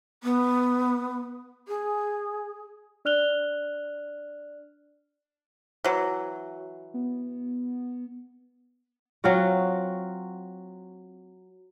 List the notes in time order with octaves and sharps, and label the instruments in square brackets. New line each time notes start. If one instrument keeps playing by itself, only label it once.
[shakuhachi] B3
G#4
[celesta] D4 D5 F6 F#6 F7 G7
[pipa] E3 F#3
[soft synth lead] B3
[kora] F#3 C4 F4 F#4